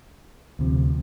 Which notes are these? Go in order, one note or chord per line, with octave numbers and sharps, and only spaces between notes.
D2 C3 F3